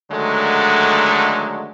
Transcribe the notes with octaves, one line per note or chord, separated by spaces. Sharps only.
D3 D#3 F#3 G#3 A3